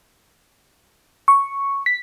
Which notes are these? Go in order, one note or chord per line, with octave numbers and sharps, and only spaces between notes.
C#6
B6